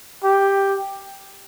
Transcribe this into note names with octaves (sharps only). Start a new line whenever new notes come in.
G4